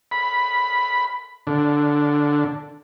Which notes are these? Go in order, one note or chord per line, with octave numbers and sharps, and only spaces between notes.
B5
D3